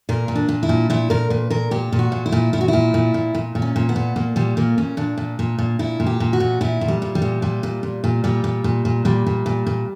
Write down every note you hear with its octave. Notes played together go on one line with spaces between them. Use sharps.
A#2 A#4
A#2
D4
A#2
E4
A#2
A#2 E4
A#2 A#4
A#2 B4
A#2 A#4
A#2 G4
A#2
F#4
A#2
E4
A#2
A#2 E4
F#4
A#2 E4
A#2
A#2
A#2
A#2
C#4
A#2
B3
A#2
A#2 A#3
A#2 G3
A#2 A#3
A#2 C#4
A#2 D4
A#2
A#2
A#2
A#2 E4
A#2
G4
A#2
F#4
A#2
A#2 E4
A#2
G3
A#2
G3
A#2
A#2 G3
A#2
A#2
A#2
A#2 G3
A#2
A#2
A#2
A#2 G3
A#2
A#2
A#2